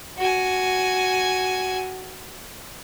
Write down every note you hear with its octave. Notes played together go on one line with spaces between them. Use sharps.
F#4 G#5